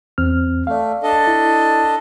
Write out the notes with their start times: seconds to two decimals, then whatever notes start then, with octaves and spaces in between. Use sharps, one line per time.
0.18 E2 C4 F6
0.67 A3 D5 F5
1.03 D4 A4 D#5
1.27 E4